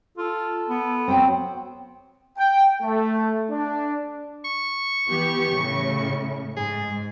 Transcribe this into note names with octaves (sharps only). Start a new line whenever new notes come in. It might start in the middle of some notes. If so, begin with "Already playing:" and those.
F4 A4
B3
F#3 C4 C5 G5
G5
A3
D4
C#6
E3 B3 G4
A2 C#3
G#2 G#4